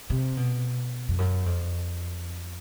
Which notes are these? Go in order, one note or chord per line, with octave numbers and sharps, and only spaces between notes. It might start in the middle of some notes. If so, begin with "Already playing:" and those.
C3
B2
F2
F#2
F2